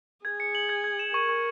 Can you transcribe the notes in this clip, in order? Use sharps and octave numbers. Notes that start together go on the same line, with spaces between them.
G#4 G#6
C#7
F#7
G#6
G#6
E7
A#4 C#6
C#6